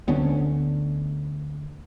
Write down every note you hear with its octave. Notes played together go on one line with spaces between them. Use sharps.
D2 B3 C#4 D4